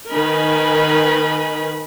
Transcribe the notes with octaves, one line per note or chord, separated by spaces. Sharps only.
D#3 A#4 B4 D#5 G#5 B5